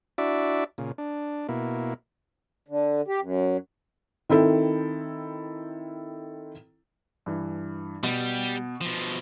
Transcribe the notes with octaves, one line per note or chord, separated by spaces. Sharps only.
D4 E4 F#4 D5 E5
A#2 C#3
D4
B2 A#3 E4
D3
G4
F#2
D#3 C4 E4 A4
G2 E3
B2 G3
B2 F3